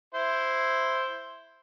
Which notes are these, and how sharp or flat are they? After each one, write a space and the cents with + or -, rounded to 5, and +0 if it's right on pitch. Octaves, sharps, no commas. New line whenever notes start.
E4 +0 C5 +0